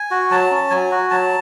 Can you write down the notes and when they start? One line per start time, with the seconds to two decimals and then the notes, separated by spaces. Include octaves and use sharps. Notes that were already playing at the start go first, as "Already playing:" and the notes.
Already playing: G#5
0.11 F#4
0.31 F#3 A5
0.51 C#4
0.70 F#3 G#5
0.91 F#4
1.10 F#3 A5